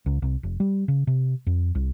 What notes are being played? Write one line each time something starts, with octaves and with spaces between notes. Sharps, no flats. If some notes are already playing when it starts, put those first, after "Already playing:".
C#2
C2
F1
G3
C#3
C3
F2
C2